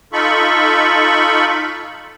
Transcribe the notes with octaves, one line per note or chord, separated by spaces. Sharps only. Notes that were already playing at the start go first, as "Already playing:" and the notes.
D#4 F4 A4 B5 C#6